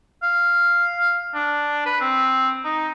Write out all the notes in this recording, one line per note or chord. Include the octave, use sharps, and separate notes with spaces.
F5
D4
B4
C4
D#4